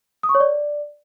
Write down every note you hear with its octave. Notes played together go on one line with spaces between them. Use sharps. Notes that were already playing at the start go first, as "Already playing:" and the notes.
D#6
C#6
C#5
D5